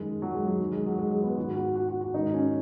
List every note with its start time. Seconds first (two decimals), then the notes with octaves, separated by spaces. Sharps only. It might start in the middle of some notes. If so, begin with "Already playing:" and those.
Already playing: F#2 D#3 G#3
0.22 F#3
0.35 G#3
0.47 F#3
0.60 F#2 D#3
0.72 G#3
0.86 F#3
0.99 G#3
1.11 G#3
1.24 B3
1.38 G#2 D#3 F#4
1.56 F#4
1.76 F#4
1.89 F#4
2.01 F#4
2.14 G#2 D#3 D#4
2.34 C#4